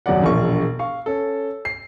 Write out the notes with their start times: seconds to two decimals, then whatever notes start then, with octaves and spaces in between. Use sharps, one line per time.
0.06 D#1 F#2 F#3 D5 F#5
0.23 E1 A#1 F4 C#6
0.79 F5 C#6
1.06 C#4 A4
1.65 C7